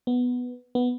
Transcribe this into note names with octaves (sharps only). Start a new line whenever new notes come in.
B3
B3